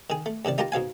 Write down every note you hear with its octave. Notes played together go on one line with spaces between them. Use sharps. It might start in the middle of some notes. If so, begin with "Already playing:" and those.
D#3 G#4
A3
G2 C3 D#3 D5
D#4 F4 G4 A#4 A5 A#5
G#2 B2 F5 G#5